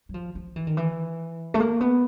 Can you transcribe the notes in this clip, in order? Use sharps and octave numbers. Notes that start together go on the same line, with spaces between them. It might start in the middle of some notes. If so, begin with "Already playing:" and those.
F#3
F3
F3
E3
D#3
E3
A3
A#3
B3